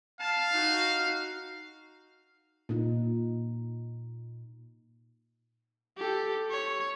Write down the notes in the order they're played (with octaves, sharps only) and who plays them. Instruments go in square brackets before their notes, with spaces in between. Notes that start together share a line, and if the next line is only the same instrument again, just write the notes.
[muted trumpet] F5 [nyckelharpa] A5
[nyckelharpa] D#4 F#4
[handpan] A#2 D#4
[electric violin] G4 A4
C#5